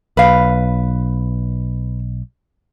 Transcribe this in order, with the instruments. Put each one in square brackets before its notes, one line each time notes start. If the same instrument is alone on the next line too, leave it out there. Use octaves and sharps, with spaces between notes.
[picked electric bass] B1 [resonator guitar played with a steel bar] B4 F5